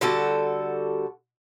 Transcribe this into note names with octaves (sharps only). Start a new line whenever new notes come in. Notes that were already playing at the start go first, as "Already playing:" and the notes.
D3 G3 F#4 A4